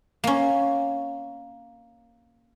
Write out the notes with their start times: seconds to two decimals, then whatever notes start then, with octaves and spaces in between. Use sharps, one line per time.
0.24 A#3 C#4